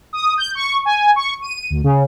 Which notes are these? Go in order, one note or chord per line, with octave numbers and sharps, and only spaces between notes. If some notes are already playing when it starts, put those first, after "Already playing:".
D#6
G6
C#6
G#5
C#6
D#7
D2
C#3